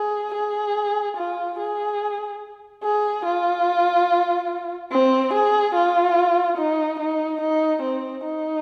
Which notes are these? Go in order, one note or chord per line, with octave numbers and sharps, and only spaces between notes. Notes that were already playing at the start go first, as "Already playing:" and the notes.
Already playing: G#4
G#4
F4
G#4
G#4
F4
C4
G#4
F4
D#4
D#4
D#4
C4
D#4